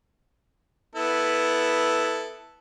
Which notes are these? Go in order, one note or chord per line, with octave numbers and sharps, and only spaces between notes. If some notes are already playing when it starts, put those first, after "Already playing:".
B3 E4 A4